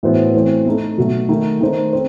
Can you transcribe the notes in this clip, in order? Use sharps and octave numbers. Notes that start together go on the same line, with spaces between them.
A2 E3 B3 F#4 C5
E3 A3 C4
A3 D#4 A4
B2 F#3 A3
D#3 A3 D#4
D#3 A3 D#4 A4 C5
C4